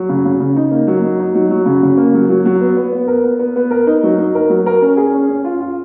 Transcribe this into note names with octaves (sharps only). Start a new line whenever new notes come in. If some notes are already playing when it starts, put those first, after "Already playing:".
Already playing: F#3
C#3
C#3
C#3
D#4
A#3
F#3
D#4
D#4
F#3
F#3
C#3
C#3
A#3
F#3
F#3
F#3
B3
B3
B3
A#4
B3
B3
B3
A#4
D#4
F#3
D#4
A#4
F#3
A#4
C#4
G#4
C#4
C#4
F4
F4